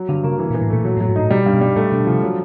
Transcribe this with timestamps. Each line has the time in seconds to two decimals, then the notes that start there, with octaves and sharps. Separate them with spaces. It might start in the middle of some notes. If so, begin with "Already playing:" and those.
Already playing: F#3
0.09 G2 D3
0.23 C#3 A#3
0.39 E3
0.50 A#2
0.54 E3
0.61 A2
0.70 A#2 A3
0.85 A#2 F#3
0.97 A2
1.01 F#3
1.08 G#2
1.16 A2 D#4
1.30 B2 G3
1.46 G2
1.53 B2
1.61 G3
1.76 A#2 A3
1.92 B2 D3
2.07 C3 F3
2.23 F#3